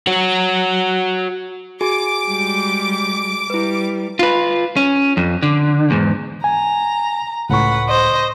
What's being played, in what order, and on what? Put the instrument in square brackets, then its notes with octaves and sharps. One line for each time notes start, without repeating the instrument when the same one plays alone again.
[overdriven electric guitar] F#4 C#5
[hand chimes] F#4 G#4 G#5 [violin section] D6
[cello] G3 G#3
[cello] G3 [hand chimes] E4 B4
[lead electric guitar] F4 B4
C#4
F2
D3
E2 G#2
[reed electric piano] G#5 [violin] A#5
[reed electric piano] C#2 A2 C#6 [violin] B4 F#5
[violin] C5 D#5